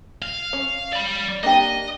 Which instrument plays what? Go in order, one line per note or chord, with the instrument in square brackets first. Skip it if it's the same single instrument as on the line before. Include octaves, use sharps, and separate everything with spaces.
[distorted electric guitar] F5
[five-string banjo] C#4
[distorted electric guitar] D5 B5
[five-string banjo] A#3 D4 G4 [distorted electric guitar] D#5